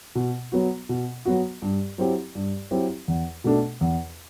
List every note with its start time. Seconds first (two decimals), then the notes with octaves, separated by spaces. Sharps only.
0.15 B2
0.52 F#3 B3 F#4
0.89 B2
1.25 F#3 B3 F#4
1.62 G2
1.98 F#3 C4 E4 G4
2.35 G2
2.71 F#3 C4 E4 G4
3.08 E2
3.44 B2 A3 D4 A4
3.81 E2